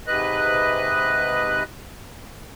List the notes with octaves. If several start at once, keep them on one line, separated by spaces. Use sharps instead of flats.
G#2 C3 B4 D#5 F#6